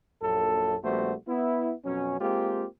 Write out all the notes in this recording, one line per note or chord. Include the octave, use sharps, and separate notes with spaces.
A#1 F#2 A4
A#1 G3 A3 B3 F#4 C5
B3 E4
F2 B2 F#3 C#4
G#3 A#3 C4 F4 G4